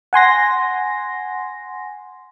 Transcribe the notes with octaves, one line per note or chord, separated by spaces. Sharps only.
F#5 G#5 C6 A#6